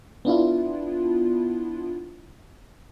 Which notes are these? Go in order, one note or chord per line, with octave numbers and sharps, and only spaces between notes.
B3 D4 E4 F4